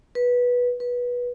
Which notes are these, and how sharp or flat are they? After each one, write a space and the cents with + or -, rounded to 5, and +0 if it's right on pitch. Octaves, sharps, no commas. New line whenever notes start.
B4 -15
B4 -20